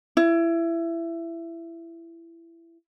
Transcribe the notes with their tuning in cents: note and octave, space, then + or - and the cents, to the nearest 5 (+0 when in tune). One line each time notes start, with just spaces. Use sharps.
E4 +20